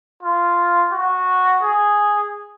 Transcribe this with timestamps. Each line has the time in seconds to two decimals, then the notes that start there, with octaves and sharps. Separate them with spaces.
0.23 F4
0.92 F#4
1.62 G#4